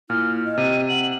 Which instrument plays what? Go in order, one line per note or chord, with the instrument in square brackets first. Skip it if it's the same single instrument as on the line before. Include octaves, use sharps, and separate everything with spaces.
[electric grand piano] A#2 [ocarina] E4 [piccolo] F6
[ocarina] D#5
[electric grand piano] C3 [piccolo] D#7
[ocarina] F#5 [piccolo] F#7